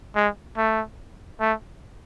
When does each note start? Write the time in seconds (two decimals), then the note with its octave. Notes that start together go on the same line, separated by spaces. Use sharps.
0.16 G#3
0.57 A3
1.40 A3